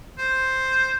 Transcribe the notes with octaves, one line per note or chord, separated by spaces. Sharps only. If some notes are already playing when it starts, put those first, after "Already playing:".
C5